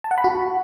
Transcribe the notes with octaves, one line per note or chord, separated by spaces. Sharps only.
A5
F#5
B5
F#4